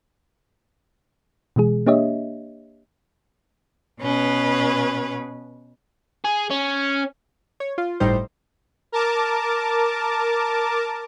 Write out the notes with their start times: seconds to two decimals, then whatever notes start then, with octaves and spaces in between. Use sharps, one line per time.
1.56 B2 E3 G#3 G#4
1.87 A#3 D4 G4 C#5 D#5 E5
4.00 B2 C#4 B4
6.25 G#4
6.51 C#4
7.60 C#5
7.78 F4
8.00 G1 A2 G3 D#4 C5
8.92 A#4 A5 D6